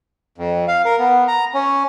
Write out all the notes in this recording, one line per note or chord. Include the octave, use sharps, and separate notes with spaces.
F2
F5
A#4
B3
A#5
C#4